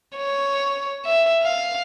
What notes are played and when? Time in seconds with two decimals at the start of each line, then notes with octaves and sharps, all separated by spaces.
0.17 C#5
1.05 E5
1.43 F5